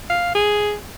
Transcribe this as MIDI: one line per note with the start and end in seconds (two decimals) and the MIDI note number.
0.10 0.32 77
0.35 0.74 68